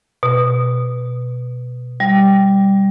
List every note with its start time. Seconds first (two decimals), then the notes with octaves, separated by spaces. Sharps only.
0.23 B2
2.00 G3